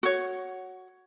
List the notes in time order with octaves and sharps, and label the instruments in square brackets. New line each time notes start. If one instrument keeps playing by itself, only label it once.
[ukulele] F#4 C#5